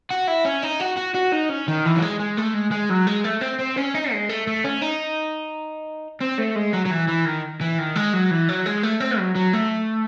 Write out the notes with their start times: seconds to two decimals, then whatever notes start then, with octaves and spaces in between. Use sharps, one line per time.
0.11 F#4
0.28 E4
0.45 C#4
0.63 D#4
0.81 F#4
0.98 F#4
1.15 F#4
1.33 D#4
1.50 C#4
1.68 D#3
1.85 E3
1.96 F#3
2.02 G#3
2.20 G#3
2.38 A3
2.55 G#3
2.72 G#3
2.90 F#3
3.07 G#3
3.25 A3
3.42 C4
3.60 C4
3.77 C#4
3.94 D#4
4.12 G#3
4.29 A3
4.47 A3
4.64 C#4
4.81 D#4
6.21 C4
6.38 A3
6.56 G#3
6.74 F#3
6.86 F#3
6.91 E3
7.09 E3
7.26 D#3
7.61 E3
7.79 D#3
7.96 G#3
8.13 F#3
8.31 E3
8.49 F#3
8.66 G#3
8.83 A3
9.00 C4
9.18 F#3
9.35 F#3
9.53 A3